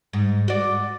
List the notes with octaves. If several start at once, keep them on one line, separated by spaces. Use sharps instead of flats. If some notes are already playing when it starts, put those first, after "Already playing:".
G#2
F#4 D5